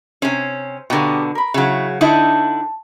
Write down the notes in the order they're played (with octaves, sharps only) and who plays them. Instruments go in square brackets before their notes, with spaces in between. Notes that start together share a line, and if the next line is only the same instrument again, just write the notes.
[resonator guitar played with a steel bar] C3 C#4 [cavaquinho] C5
[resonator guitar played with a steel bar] B2 D3 [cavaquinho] G4 A#4 F5
[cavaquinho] A#4 B5
[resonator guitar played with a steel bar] C#3 F#3 [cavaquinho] E4 C#5
[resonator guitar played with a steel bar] D3 D#4 E4 [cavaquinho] A5